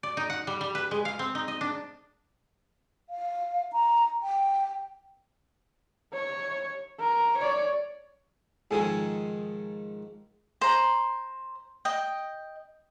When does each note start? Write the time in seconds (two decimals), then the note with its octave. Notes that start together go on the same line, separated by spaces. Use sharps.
0.03 D5
0.17 D#4
0.30 F#5
0.47 G3
0.61 G3
0.75 B4
0.91 G#3
1.05 F5
1.19 C4
1.35 D#4
1.48 D#5
1.61 D4
3.10 F5
3.73 A#5
4.23 G5
6.13 C#5
7.00 A#4
7.38 C#5 D5
8.71 G#2 D#3 F3 G#4 A4 G#5
10.61 C5 A#5
11.85 D#5 G5